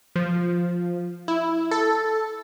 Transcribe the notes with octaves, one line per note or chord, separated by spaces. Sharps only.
F3
E4
A4